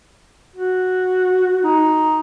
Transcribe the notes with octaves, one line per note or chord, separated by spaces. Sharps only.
F#4
D#4